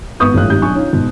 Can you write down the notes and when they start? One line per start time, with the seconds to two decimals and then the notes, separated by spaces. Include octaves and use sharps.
0.20 G#1 B3 B4 C#6 D#6 G6
0.34 A1 G#2 G3 A3 F4 F#6
0.50 G#1 D#3 G4 G6
0.62 B1 D4 G#5 C#6
0.75 C#4 D#4 F4
0.93 G#2 B2